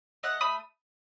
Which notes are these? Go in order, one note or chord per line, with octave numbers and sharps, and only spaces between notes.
A3 D#5 F#5
A3 B5 D#6